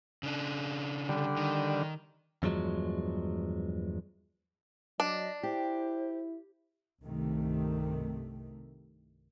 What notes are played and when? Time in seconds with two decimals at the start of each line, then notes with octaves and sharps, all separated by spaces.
0.23 C#3 D4
1.09 D3 G3
1.37 D#3
2.43 E2 G2 F3 F#3 G#3
5.00 F#3 D4 D#5
5.43 E4 G4 C5
7.04 C2 G2 C3 D#3 A3